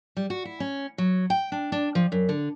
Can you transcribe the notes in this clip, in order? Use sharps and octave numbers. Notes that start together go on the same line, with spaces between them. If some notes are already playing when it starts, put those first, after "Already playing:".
G3
F#4
E4
C#4
F#3
G5
D4
D4
F3
F#2
D3